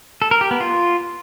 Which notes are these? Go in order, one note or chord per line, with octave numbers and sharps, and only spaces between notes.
A4
A#4
G4
B3
F4